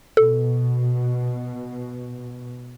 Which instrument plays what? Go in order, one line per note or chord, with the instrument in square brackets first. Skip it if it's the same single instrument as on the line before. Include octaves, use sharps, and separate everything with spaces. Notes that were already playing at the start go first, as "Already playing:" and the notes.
[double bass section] B2 [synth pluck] A4